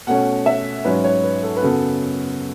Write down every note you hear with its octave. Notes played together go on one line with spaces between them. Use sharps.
B2 A3 C#4 F#5
E5
G#2 F#3 C#4 B4
C#5
B4
A4
B4
F#2 C#3 F#3 B3 A4